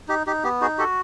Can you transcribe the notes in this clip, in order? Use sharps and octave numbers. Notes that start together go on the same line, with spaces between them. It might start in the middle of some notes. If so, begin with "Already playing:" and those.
D#4 G4
D#4 G4
B3 G4
D#4 F#4 G#4
F#4 G4 A4